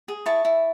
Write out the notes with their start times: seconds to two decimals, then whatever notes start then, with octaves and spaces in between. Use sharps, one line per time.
0.08 G#4
0.26 E4 A5 C#6
0.45 E4